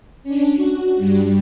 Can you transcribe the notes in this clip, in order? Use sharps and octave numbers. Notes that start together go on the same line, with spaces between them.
C#4 D4
F#4
G2 G3